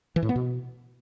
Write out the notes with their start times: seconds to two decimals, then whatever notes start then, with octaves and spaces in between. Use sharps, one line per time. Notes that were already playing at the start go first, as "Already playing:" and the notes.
0.16 E3
0.23 A2
0.29 B3
0.36 B2